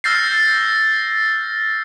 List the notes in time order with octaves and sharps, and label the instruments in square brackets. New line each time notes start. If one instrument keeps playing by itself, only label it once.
[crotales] E6 F6 G6 A6 A#6 C7